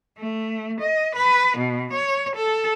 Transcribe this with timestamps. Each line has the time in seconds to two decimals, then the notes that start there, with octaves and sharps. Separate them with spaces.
0.18 A3
0.80 D#5
1.15 B4
1.58 B2
1.93 C#5
2.35 A4